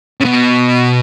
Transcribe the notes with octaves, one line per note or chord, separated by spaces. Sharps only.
C#3
B2